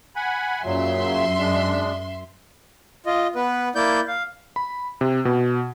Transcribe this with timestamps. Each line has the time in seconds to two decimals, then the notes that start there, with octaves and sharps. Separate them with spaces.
0.16 F#5 G#5 B5
0.63 F#2 A#2 C#3 F#3 E5 C6
1.38 G#3 D4
3.06 F4 D#5
3.35 B3 B4
3.75 A#3 E4 D5 G6
4.08 F5
4.56 B5
5.01 C3
5.25 B2